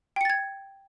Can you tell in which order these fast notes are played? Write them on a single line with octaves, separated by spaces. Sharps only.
G5 C#7 A6 G#6